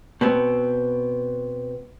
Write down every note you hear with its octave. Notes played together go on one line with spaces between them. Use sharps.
B2 B3 C4